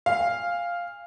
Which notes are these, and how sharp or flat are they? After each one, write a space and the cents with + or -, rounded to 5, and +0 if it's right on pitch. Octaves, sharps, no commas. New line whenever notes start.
F5 +0 G#5 -30